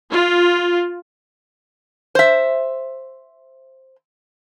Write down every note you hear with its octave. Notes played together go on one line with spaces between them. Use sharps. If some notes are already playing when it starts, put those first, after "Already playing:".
F4
C5 E5